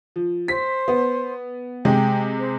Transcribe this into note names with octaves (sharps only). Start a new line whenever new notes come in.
F3
C5 B6
B3
C3 G#3 G5
C5